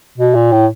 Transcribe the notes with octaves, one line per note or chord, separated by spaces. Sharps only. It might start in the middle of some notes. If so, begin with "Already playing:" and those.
B2
A#2
A2